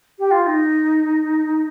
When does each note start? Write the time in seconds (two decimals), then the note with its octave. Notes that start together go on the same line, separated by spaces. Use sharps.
0.19 G4
0.31 F4
0.42 F4
0.46 D#4